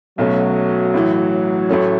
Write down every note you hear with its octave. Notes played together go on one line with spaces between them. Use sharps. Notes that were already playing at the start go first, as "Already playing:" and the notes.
B1 B2 F#3 A3 C#4
A1 A2 E3
A1 A2 A3 C#4